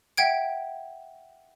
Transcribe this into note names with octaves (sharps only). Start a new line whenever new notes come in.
E5 F#5 G5 G#6 D7